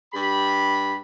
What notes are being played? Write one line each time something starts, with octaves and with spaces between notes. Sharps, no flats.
G2 G4 B5